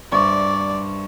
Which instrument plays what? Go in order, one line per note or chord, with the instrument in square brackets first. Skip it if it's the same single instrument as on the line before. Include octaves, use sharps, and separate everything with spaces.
[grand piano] G2 [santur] C5 E5 C#6 [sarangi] D5